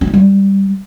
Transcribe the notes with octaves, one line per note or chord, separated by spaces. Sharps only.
C#4
D#4
G3